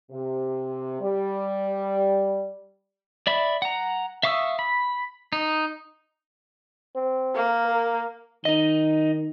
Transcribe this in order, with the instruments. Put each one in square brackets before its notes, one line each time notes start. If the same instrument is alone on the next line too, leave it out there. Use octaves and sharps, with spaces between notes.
[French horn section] C3
G3
[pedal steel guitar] D5 E5 B5
F#5 A#5
E5 F5 C#6 D#6 E6
B5
D#4
[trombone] C4
[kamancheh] A#3
[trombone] A#4
[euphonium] D#3 [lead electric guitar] D#4 D#5